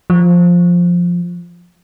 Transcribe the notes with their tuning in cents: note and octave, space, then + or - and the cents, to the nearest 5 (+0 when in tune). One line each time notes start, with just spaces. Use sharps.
F3 +5